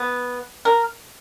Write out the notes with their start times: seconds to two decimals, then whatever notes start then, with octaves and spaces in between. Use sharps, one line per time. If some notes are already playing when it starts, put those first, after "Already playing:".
Already playing: B3
0.65 A#4